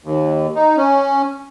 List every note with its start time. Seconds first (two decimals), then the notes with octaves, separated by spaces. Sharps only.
0.04 D#2
0.55 D#4
0.77 C#4